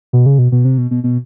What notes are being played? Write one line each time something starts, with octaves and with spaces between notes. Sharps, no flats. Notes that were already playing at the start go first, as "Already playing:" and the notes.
B2
C#3
B2
B2
C3
B2
B2
B2